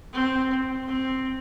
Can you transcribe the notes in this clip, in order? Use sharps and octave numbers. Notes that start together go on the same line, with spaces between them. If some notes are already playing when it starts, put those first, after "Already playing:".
C4
C4